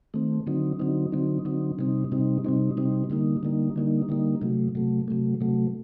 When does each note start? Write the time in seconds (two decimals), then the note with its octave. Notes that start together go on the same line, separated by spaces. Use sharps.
0.14 D#3 A3 C4
0.47 D3 F#3 C4 D#4
0.79 D3 F#3 C4 D#4
1.12 D3 F#3 C4 D#4
1.45 D3 F#3 C4 D#4
1.79 C3 G3 C4 D#4
2.12 C3 G3 C4 D#4
2.45 C3 G3 C4 D#4
2.77 C3 G3 C4 D#4
3.10 D3 G3 A#3 D#4
3.43 D3 G3 A#3 D#4
3.76 D3 G3 A#3 D#4
4.09 D3 G3 A#3 D#4
4.41 C3 F#3 A3
4.75 C3 F#3 A3
5.08 C3 F#3 A3
5.41 C3 F#3 A3